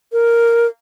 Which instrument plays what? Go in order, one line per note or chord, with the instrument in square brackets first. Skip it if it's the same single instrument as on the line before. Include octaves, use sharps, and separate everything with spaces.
[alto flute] A#4